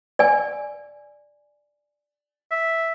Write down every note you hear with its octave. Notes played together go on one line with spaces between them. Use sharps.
D5 G#5
E5